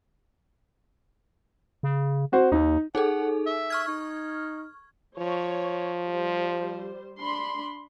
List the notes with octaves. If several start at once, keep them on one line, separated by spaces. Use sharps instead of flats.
C#3
C4 F#4 C5
D#2 D#4
D#4 G#4 A4 F#5
E5
C#6 F6 G#6
D#4
F3 C#5
G3 C5
D4 B5 C6